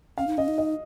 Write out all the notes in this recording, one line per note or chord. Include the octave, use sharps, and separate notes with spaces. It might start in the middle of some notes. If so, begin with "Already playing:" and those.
C#4 F5
D#4
C#4 D#5
D#4
D#5